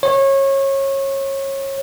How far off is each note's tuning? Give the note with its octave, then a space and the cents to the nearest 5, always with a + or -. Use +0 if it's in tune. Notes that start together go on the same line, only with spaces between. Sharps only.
C#5 -25